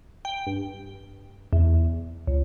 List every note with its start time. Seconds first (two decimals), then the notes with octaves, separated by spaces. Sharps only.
0.25 G5
0.47 G2
1.53 E2
2.27 C#2